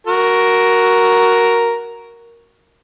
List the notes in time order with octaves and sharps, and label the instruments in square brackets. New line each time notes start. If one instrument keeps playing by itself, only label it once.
[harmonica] F#4 A#4